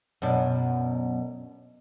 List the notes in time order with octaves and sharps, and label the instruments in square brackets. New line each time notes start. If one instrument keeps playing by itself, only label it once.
[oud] F#2 B2 D4